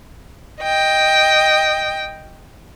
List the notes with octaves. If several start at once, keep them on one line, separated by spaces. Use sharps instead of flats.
D#5 G5